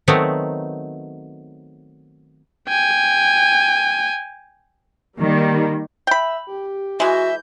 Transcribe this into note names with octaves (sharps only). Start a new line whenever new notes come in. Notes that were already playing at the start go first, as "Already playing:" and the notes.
D#3 F#3 A3 B3 C4 D#4
G5 G#5
D#3 G3 A#3
E5 G5 B5
G4
E3 G#3 F#4 E5 G6